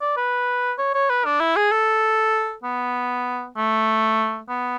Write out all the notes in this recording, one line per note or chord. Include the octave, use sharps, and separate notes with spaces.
D5
B4
C#5
C#5
B4
D4
E4
G#4
A4
B3
A3
B3